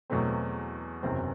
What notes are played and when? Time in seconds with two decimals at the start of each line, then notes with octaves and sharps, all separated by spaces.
0.10 E2 B2 F#3 A3 C4
1.03 F#1 E2 C3 F#3 C4